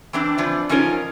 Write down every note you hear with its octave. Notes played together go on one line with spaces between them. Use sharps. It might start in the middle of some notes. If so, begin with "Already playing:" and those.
E3 C4 D4
E3 F3 D5
F3 C#4 D#4 F4 A#4 C#5